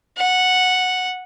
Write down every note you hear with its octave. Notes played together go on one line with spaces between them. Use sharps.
F#5